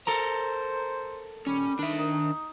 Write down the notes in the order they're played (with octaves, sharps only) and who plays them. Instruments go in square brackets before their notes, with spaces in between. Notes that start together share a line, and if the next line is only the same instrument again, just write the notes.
[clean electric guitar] A4 A#4 A#5 [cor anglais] C5
[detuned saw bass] D#1 [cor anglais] G3 [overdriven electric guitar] C#4
[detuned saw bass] D#3 [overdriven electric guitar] D4 E5
[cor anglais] D#4